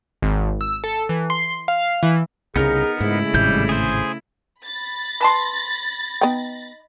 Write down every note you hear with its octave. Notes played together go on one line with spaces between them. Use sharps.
G#1
E6
A4
E3
C6
F5
E3
C2 C#3 B3 D#4 G#4 A#4
G#2 C#3 G#3 A3 E4
G#1 A2 C3 G3 G6
G#4 C5
B5 A6 A#6
B4 A5 C6
B3 D#4 G5